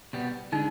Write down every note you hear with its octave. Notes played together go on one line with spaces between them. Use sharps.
C2 B2 G3 B3
D3 G#3 D4 D#4